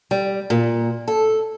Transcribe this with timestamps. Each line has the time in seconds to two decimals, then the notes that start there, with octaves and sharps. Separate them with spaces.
0.11 G3
0.50 A#2
1.08 A4